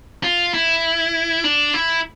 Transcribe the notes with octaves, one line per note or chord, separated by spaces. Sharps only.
F4
E4
D4
E4